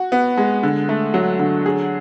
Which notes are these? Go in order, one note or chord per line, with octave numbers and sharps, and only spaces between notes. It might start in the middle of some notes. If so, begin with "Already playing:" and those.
Already playing: F#4
B3
G#3
D3
A3
F#3
D3
G#4